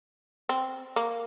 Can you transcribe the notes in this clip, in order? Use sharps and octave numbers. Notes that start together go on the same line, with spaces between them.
C4
A#3